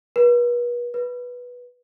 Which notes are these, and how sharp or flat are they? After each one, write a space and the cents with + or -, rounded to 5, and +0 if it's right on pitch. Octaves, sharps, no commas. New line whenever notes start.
B4 -40
B4 -10